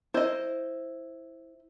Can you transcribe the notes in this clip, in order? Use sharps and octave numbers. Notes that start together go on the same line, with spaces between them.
E4 C5 D#5